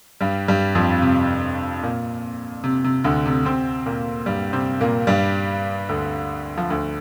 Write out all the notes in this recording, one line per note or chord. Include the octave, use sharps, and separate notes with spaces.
G2 G3
G2 G3
F2 F3
C3
A#2
C3
C3
D2 D3
C3
C3 C4
A#2 A#3
G2 G3
C3 C4
A#2 A#3
G2 G3
D2 D3
F3
D2 D3